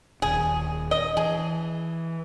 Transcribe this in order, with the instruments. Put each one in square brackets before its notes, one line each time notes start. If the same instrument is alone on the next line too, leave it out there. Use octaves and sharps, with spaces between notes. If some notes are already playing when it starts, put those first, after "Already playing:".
[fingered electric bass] D#1 D#2 [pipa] G#4
[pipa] D#5
[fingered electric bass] E3 [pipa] G#4